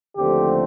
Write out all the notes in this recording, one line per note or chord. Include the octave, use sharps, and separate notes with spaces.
D#2 D3 F3 A3 C4 G4